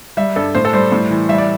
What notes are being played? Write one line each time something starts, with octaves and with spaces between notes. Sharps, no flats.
G3 E5
G2 A4
A2 C5
A4
G3 C5
A2
E3
G3 E5
D5